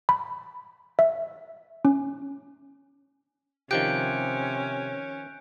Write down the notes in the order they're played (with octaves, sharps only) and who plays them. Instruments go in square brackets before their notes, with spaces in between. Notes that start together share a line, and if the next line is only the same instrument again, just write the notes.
[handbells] B5
E5
C#4
[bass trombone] C3 [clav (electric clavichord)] D#3 F3 G4 [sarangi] C#4 [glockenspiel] F#6 G6 D7